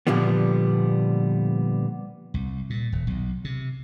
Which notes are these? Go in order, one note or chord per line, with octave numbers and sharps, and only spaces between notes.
A#2 D3 F3 G3 B3
C2
A#2
D#1
B1
C3